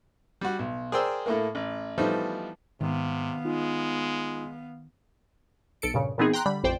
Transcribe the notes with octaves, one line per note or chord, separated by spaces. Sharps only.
G3 F#4
B1
G#4 A#4 C5 D5 G5 E6
A2 A3 A#3
A1
E3 F3 G3 A3 B3 D#4
G#2 C3 D#3 B3 F5
G#3 D#4 F4
B1 A4 C#7 D7
G2 A#2 C#3
A#2 E3 B3 C4 D#4 G#4
G5 A#5 C6 F#6
D3 G3 B5
A1 F2 C5 D5 G5